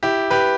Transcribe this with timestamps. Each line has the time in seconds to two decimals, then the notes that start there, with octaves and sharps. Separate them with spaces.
0.03 E4 G4
0.30 G4 B4